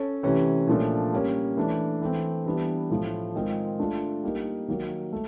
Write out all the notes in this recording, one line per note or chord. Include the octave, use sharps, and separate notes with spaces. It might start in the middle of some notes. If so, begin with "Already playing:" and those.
Already playing: C#4 A4
C3 E3 A3 C#4
A#2 F3 A3 D4
G3 A#3 C#4
E3 A3 D4
E3 A3 C4
E3 G3 B3 D4
A2 F3 A3
D#3 G#3 C4 F4 A#4
A3 D4 F4
G3 A#3 D#4
D#3 F#3 A#3
A3